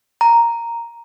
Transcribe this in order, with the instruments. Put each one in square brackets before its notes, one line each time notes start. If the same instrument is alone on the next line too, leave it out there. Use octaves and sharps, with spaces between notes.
[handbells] A#5